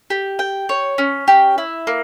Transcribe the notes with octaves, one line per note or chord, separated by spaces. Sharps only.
G4
G5
C#5
C#4
G4
E4
A#3